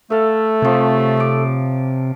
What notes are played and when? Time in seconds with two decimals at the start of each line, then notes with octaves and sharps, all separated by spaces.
0.10 A3 A4 E5 F5
0.62 C3 F3 C#5
1.17 A5 D6